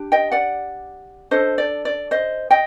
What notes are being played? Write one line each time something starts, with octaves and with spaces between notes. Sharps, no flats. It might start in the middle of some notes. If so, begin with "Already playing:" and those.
Already playing: D4 G4
D#5 G5
D5 F#5
D4 A4 C5 D#5
D5
D5
C5 D#5
D#5 G5